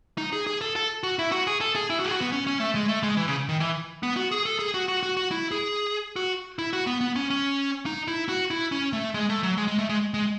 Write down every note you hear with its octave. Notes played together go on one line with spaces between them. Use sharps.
D#4
G#4
G#4
A4
A4
F#4
E4
F#4
G#4
A4
G#4
E4
F#4
G#4
F#4
B3
C#4
C#4
A3
G#3
A3
G#3
E3
C#3
D#3
E3
B3
F#4
G#4
A4
G#4
F#4
F#4
F#4
F#4
E4
G#4
F#4
E4
F#4
B3
B3
C#4
C#4
D#4
E4
F#4
E4
C#4
A3
G#3
A3
F#3
G#3
G#3
A3
G#3
G#3